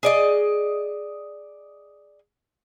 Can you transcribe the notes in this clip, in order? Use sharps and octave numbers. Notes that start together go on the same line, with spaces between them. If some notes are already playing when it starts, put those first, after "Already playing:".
G#4 D5 D#5